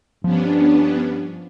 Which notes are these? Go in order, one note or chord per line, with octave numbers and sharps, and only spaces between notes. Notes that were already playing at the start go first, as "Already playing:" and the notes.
G2 F3 B3 C#4 D4